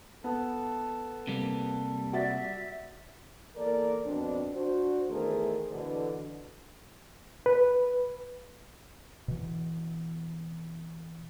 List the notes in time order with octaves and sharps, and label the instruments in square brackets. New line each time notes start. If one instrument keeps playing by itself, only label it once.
[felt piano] B3 [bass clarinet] A4
[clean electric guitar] C3 G3 A#3
[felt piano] F#4 D5 A6 [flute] E5
[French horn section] E2 A#3 A4 A#4 D5
F2 B2 C4 D4
D4 F#4 C5
E2 D#3 A3 G#4 A#4 C5
B2 D3 E3
[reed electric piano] B4
[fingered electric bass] B2 E3